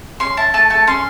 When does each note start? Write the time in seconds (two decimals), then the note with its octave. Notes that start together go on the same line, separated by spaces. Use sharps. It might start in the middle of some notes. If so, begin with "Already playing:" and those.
0.20 C#4 C6
0.37 E4 A5
0.54 A3 A5
0.70 A3 A5
0.87 C#4 C6